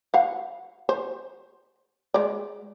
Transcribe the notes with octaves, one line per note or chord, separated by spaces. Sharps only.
F5 F#5
C5
G#3 D5